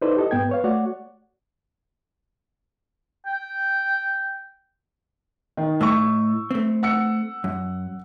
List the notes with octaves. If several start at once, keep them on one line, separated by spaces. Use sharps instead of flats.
D#4 E4 A4 B4 C5 D5
G4 A4 D#5
G#2 B3 G5 G#6
B4 C#5 F5
A3 F#4 C#5 D5 F#5
G5
D#3
A2 A3 D#5 C#6 E6
A3 C4
F#5 E6 C#7
F#2